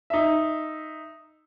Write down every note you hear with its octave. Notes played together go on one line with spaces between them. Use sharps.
D#4 E5